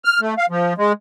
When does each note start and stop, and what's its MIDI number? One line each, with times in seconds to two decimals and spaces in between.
0.05 0.20 89
0.21 0.34 57
0.38 0.46 77
0.50 0.73 53
0.78 0.93 56